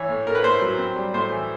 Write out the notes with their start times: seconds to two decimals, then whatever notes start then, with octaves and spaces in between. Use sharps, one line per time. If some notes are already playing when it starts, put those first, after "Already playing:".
Already playing: E3 C#5
0.09 A2
0.26 A3 A#4
0.35 B4
0.43 A2 C5
0.62 F#3
0.78 C4
0.96 G3
1.14 A2 C5
1.32 E3